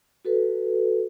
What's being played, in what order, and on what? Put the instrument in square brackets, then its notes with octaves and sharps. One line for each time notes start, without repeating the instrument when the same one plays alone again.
[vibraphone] F#4 A4 B4